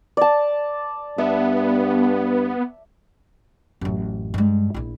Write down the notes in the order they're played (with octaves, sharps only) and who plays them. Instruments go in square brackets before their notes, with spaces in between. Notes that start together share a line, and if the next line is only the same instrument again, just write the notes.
[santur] D5 A5
[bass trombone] G2 [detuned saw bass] B3 [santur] E5
[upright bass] A1 F#2
G2 G#3
A#1 E4